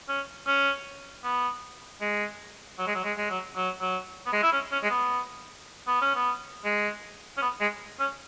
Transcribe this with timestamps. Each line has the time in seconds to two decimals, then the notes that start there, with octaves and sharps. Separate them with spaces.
0.09 C#4
0.47 C#4
1.24 B3
2.01 G#3
2.79 F#3
2.87 G#3
2.95 F#3
3.04 G#3
3.18 G#3
3.30 F#3
3.56 F#3
3.81 F#3
4.26 B3
4.33 G#3
4.43 E4
4.52 C#4
4.72 C#4
4.83 G#3
4.90 B3
5.87 B3
6.02 C#4
6.15 B3
6.65 G#3
7.37 C#4
7.42 B3
7.61 G#3
8.00 C#4